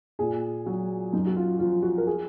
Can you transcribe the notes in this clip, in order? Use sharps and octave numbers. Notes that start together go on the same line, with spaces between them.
A#2 G#4
F#3 F#4
F#2 D#4
F#4
F4
F3 F4
F#4
A#4
G#4